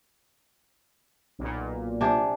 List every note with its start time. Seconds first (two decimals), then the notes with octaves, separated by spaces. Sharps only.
1.39 B1 A#2
2.01 C3 D4 G#4